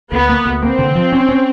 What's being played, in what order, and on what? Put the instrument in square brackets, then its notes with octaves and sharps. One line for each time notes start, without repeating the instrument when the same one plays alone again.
[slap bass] D2 [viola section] B3
[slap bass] A#3
D2
[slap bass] A#3 [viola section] C4
[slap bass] D3
F3
C#4
C#4